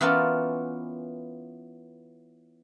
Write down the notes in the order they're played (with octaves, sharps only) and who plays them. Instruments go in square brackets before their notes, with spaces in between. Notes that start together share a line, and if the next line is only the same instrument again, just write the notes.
[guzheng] E3 B3 C#4 F4 A#4 D5